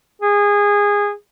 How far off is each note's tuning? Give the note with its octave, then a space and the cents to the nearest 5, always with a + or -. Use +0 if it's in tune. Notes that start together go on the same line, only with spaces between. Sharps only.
G#4 -20